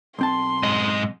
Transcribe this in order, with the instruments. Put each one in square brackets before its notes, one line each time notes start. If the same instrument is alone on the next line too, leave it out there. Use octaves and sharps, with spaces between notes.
[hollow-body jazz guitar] B1 C4 A5 [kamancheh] C6
[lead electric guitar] G#2 D#5